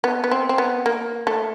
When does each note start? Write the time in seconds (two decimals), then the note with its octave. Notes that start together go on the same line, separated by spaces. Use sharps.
0.04 B3
0.24 B3
0.31 C4
0.49 C4
0.58 B3
0.86 A#3
1.27 A3